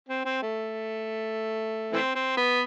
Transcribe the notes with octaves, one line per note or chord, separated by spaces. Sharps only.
C4
C4
A3
E3 A3 C4
C4
B3